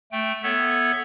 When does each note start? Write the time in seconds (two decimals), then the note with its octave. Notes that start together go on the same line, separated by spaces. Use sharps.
0.12 A3 G5
0.43 B3 A4 C#5 E5